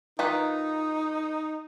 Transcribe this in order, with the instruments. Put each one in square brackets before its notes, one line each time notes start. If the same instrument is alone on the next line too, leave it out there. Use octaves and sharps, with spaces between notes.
[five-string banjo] D#3 F4 B4 [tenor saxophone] D#4